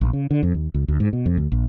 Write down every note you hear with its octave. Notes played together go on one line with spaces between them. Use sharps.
A#1
C#3
D3
F2
D#2
C#2
D2
G#2
B2
F2
D2
A#1